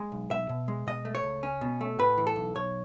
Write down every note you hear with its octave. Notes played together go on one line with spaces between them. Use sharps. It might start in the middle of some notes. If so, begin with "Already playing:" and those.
Already playing: G#3
B1
B1 E5
B2
G#3
B2 D#5
A3
C#5
C#2
C#4
B2
A3
A2 B4
E3
A4
B1
B1 C#5